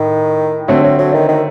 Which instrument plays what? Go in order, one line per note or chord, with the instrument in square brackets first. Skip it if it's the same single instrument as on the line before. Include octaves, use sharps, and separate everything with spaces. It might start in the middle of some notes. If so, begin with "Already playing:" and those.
Already playing: [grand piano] A2 [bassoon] D#3
[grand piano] D3 A3 C4 [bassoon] F#3
[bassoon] F#3
F#3
D#3
D#3